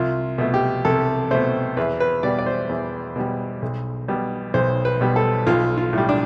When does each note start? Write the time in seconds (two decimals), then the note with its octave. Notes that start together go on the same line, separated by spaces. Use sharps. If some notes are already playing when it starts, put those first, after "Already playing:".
Already playing: C2 F4
0.38 B2 A3
0.54 G4
0.85 C2 A4
1.31 B2 A3 C5
1.77 E2 B4
2.00 B4
2.23 B2 G3 D5
2.39 D5
2.46 C5
2.69 E2
3.16 B2 G3
3.62 B1
4.08 B2 G3
4.54 B1 C5
4.85 B4
5.01 B2 G3
5.16 A4
5.47 B1 F4
5.77 F4
5.93 A2 G3
6.09 D4